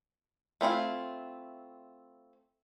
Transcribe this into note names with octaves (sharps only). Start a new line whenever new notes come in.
A3 C4 E4 F4